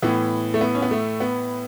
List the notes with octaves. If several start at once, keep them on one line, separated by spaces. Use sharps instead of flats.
A2 E3 B3
A3
B3
C#4
B3
A3
B3